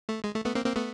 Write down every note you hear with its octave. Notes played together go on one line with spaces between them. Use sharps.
A3
G#3
A3
A3 B3
A#3 C4
A#3 C4
A3 B3